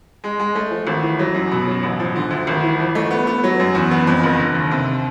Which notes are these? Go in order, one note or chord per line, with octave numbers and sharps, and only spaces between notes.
G#3
G#3
A3
F3
G#1
E3
F#3
F#2
B2
F#3
A1
F3
D3
D2
G#1
E3
F3
A3
B3
B3
F#3
F#2
E2
B3
F2
F#1
D3
D#2
C3